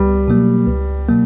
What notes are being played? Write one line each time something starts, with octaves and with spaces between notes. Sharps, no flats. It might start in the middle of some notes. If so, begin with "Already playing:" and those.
Already playing: C#2 G3
B2 F#3 A#3
C#2
B2 F#3 A#3